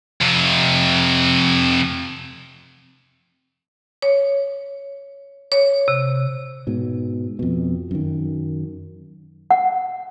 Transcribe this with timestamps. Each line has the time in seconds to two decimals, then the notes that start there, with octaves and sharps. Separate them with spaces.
0.22 F2 C3
4.02 C#5
5.52 C#5
5.88 C3
6.67 G#2 B2
7.39 F2 B2
7.91 F#2 D#3
9.51 F#5